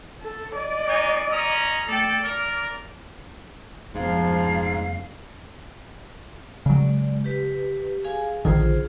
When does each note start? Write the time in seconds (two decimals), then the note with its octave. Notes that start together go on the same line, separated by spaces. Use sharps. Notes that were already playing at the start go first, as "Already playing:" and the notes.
0.22 A4
0.56 D5 D#5
0.86 G#3 D#4 G#5
1.30 C#4 A#5 D#6
1.88 A3 A4 D5 G5
2.23 A#4 D5
3.95 F1 G#2 F3 B3 F5
6.66 C#3 F#3 G#3 D5
7.24 G4 B4
8.04 G#4 F5 G#5
8.45 A#1 D3 D#3 F4 G#4 C5